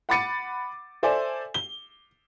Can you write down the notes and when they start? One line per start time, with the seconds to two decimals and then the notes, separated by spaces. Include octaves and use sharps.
0.09 F#5 B5 D6 A6 C#7 D#7
1.03 A4 C5 D5 E5 G#5
1.54 G7